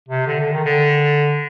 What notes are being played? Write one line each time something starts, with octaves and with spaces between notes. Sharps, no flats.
C3
D3
D3
D#3
D3